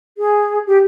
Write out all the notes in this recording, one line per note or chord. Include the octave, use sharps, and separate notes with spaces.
G#4
G4